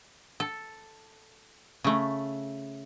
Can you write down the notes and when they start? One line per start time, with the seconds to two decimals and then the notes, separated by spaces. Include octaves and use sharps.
0.40 A4
1.84 C#3 A3